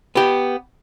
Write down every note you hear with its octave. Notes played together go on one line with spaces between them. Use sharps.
B3 G4